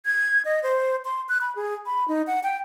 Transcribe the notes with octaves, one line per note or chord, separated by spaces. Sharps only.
G#6
D#5
C5
C6
F#6
B5
G#4
B5
D#4
F#5
G5